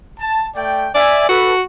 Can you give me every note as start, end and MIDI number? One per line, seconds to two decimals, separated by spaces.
0.20 0.48 81
0.55 0.89 57
0.55 0.89 74
0.55 0.89 79
0.94 1.26 74
0.94 1.28 76
0.94 1.28 80
1.29 1.62 66
1.29 1.53 69
1.29 1.53 71